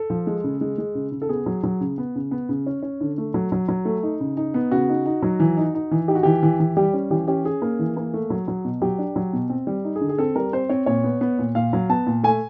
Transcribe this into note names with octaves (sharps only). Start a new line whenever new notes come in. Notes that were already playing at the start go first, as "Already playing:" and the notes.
Already playing: A4
F3
G#3
C#3
G#3
G#3
C#3
C#3
A4
B3 G#4
F#3
F#3
C#3
B3
C#3
B3
C#3
C#4
C#4
D3
A3
F#3
F#3
F#3
A3
D#4
C#3
D#4
B3
C#3 F#4
D#4
D#4
F#3
E3
D#4
D#4
E3
D#4 G4
F#4
E3 G4
E3
E3
G3 G4
C#4
E3 G4
C#4 G4
C#4 G#4
A#3
E3
A#3
A3
F#3
F#3
B2
F#3 G4
D4
F#3
B2
C4
G3
D#4
G#4
D3
G#4
C4 A4
G3 A#4
C4 C5
C4 C#5
A#2 C#5
B3
B3
A#2
A#2 F5
F#3
B3 A5
A#2
A3 G#5